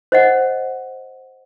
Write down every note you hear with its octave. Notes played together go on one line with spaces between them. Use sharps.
C5 D#5 F#5